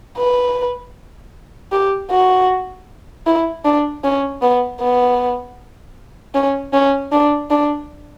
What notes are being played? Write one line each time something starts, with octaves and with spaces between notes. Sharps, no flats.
B4
G4
F#4
E4
D4
C#4
B3
B3
C#4
C#4
D4
D4